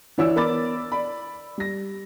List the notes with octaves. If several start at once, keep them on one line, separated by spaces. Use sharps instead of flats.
E3 E4 C#5 D5 E6
B3 A#4 D5 B5 D6 A6
D5 B5
G3 A#6